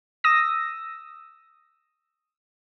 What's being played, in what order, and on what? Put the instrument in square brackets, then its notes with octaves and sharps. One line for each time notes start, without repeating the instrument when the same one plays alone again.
[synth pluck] D#6 E6 A#6